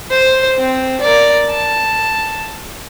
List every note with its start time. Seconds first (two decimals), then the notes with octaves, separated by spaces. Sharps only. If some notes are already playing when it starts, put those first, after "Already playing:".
0.10 C5
0.58 C4
1.01 A#4 D5
1.50 A5